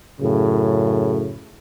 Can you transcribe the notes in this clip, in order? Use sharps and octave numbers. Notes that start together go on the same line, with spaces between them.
F#2 A2 C#3